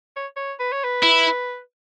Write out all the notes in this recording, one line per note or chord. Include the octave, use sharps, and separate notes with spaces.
C#5
C#5
B4
C#5
B4
E4